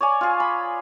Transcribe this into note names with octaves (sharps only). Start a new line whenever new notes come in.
C#5 D5 G#5
F4 G#4
B5